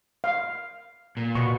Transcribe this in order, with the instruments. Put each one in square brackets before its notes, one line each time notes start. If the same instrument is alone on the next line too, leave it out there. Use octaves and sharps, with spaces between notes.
[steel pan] F5
[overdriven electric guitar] A#2
[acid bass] B2 [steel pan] C#6